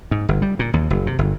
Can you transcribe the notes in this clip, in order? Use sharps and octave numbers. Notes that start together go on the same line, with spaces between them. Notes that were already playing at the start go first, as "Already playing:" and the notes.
G#2
G1
G3
A#2
D#2
F#1
C3
G1